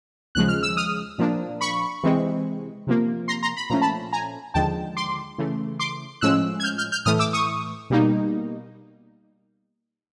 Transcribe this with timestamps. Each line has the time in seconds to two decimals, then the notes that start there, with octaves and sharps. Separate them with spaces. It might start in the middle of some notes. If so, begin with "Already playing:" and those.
0.35 D#2 C#3 F3 G#3 F#6
0.48 F6
0.63 E6
0.77 D#6 F6
1.18 A#2 F3 A#3 D4
1.61 B5 C#6
2.03 C3 E3 G#3 C4
2.87 C3 F3 A#3
3.28 A#5 C6
3.43 A#5 C6
3.57 B5
3.70 A#2 F3 A3 C#4 A#5
3.81 A5 B5
4.13 G#5 A#5
4.54 D#2 D3 F3 G#3 G5 A5
4.97 C6 D6
5.38 C#3 E3 A3
5.79 C6 D6
6.21 A2 F3 G#3 C#4 E6 F#6
6.60 G#6
6.63 F6 G6
6.78 F6 G6
6.92 F6 G6
7.05 A2 E3 A3 D#6 F6
7.19 D6 E6
7.33 C#6 D#6
7.90 B2 G3 A#3 D#4